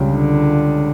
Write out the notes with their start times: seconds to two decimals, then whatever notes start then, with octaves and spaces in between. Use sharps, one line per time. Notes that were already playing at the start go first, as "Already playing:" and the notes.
Already playing: C#2 C#3 G3
0.12 D3